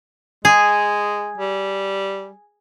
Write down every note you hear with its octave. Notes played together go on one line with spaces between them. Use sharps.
G#3 G#4
G3